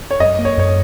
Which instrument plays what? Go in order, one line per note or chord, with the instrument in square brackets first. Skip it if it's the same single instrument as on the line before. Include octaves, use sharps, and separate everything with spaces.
[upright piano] C#5
[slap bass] F#2 [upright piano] D#5
[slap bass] A#3
[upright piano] C#5
[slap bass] F#2 [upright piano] C#5